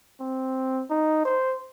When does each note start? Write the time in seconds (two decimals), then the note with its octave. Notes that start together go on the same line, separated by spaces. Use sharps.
0.20 C4
0.90 D#4
1.25 C5